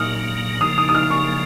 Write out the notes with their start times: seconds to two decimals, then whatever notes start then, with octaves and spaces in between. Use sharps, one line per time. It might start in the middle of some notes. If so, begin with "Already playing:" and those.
Already playing: A#2 F#3 A#3 D#6 F6
0.61 C#3 F3 A#3 D#6
0.78 D#6
0.89 D#6
0.95 F6
1.10 C#6